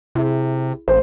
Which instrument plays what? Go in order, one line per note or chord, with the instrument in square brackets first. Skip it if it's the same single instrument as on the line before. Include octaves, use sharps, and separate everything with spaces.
[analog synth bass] C3 [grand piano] E4 G#4
[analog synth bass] A1 [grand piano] C5